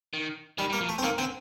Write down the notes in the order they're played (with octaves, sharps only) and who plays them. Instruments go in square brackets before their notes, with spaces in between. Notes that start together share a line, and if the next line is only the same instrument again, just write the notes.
[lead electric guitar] D#3
[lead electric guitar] D#3 [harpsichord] G3
[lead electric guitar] G3 [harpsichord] A#3
[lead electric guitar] F3
[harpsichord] A3
C4
[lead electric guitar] D#3 [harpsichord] A#3
[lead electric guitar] D3 [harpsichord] C4